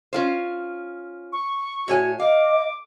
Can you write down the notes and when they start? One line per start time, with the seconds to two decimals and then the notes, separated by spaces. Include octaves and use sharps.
0.13 C#4 F4 C5
1.33 C#6
1.88 A2 F#4 C#5 G#5
2.20 D#5 F5 D6